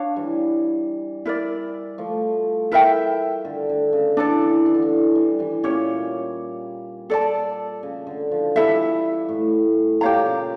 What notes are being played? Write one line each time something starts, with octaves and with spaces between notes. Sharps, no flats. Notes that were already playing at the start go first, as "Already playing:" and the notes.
Already playing: D4 C#5 F5
E3 G3
E4 A#4 D5
F3 A3
E4 A#4 E5 G5
D3
D3
C#3
E3 D4 A4 D5
E3
E3
D3
E3
E3 G3
E3 G3
A#2 C#4 G4 C#5
A4 D5 A5
C#3
D3
F3
E3 G3 E4 A4 E5
A2
A#2 G4 C#5 F5 A#5
C#3